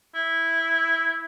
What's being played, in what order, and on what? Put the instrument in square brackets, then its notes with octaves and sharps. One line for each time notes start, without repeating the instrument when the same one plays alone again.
[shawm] E4